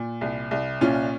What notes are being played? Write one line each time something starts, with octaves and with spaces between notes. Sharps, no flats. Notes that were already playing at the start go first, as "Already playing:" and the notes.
Already playing: A#2
C2
C2
A#2 C#4 F4